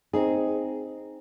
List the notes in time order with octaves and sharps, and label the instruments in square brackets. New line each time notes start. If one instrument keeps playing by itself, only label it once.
[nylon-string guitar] C4 D#4 G#4